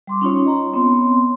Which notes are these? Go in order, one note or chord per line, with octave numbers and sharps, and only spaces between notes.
G3 C6 D6
C#4 D#4 F4 C#5
D#5 A#5 C6
B3 C4 C#5 C6